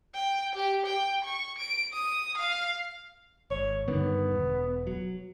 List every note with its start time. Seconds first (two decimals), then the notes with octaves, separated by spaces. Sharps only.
0.15 G5
0.55 G4
0.86 G5
1.25 C#6
1.58 D7
1.93 D#6
2.37 F5
3.51 G#1 C#5
3.88 G2 D3 D#3 B3
4.32 E1
4.87 F#3